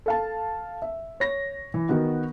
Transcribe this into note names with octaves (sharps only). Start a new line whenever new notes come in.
A4 F5 A5
E5
C#5 A#6
E3
D#3 B3 F#4